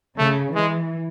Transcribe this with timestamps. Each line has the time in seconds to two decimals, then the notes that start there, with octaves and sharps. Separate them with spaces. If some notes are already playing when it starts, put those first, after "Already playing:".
0.18 C#3 A3
0.55 E3 G#3